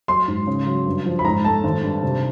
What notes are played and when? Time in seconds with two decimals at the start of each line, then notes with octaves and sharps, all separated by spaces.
0.08 F#3 C6
0.28 G#2
0.47 C#3
0.67 F#3
0.86 G2
1.05 F3
1.19 B5
1.25 G#2 A#5
1.44 A3 A5
1.64 G#1
1.83 G2
2.03 C3